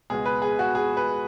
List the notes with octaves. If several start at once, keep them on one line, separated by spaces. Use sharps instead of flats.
C#2 B2 G#3 G#4
B4
G#4
F#4
G#4
B4